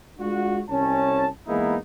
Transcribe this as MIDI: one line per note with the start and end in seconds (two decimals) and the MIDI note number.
0.19 0.61 56
0.19 0.61 62
0.19 0.61 65
0.19 0.61 66
0.68 1.27 36
0.68 1.27 61
0.68 1.27 81
1.47 1.76 40
1.47 1.76 56
1.47 1.76 58
1.47 1.76 59
1.47 1.76 63
1.47 1.76 64